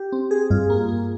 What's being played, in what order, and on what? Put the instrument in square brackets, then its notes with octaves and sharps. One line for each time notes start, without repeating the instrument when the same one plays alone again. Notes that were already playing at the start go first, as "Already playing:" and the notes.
Already playing: [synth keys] G4
C4
G#4
[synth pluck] G2 [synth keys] F4
[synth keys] A#3
A#3